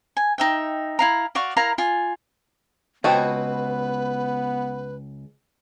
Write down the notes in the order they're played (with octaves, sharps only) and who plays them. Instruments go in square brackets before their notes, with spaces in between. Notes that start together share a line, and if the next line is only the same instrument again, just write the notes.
[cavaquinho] G#5
D#4 E5 G5
E4 F5 A#5
F#4 D5 F5 C#6
E4 A#4 F5 A#5
F4 G#5
[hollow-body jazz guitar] C#2 D#5 A5 [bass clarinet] B3 [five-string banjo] C4 F#4 [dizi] B4